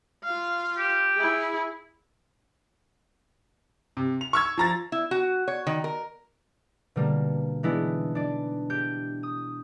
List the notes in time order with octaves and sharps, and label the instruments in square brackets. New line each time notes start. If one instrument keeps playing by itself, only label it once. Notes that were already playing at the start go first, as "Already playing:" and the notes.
[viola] F4 F5
[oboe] G4
[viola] E4 G#4
[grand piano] C3
F7
C#6 E6 G#6
F3 A#5 A6
[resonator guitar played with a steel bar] E4
F#4
C#5
D#3
A#4
[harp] B2 D3 G3 A#3
E3 G#3 B3 D4 E4
D4 D5
G4 G6 D7
D#6